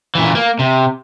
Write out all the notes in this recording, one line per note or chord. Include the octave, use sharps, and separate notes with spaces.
A#2 E3
A#3
C3